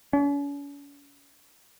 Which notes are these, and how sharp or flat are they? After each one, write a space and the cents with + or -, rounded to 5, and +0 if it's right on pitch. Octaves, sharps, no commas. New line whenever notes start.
C#4 +40